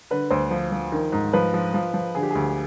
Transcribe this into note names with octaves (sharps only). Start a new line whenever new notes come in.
D3 B4
D2 C5
F3
F3
D#3
G#2
F3 B4
F3
F3
F3
D3 G#4
G4
D2 G#4